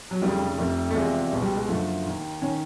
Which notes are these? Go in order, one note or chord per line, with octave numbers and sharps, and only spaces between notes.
F#3
F1 F2 C#3 G3
F1 F2 C3
A3
E2 C3 F3 G#3
C#2 B2
G3
G#3
F#1 F#2 D3 F3 A3
D#2 D#3
D#3 C#4